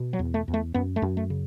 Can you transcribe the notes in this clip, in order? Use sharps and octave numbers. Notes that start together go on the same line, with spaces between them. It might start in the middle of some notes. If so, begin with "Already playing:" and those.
Already playing: B2
F#3
E2
A3
E2
A3
F#2 B3
A3
F#2
A3
C#3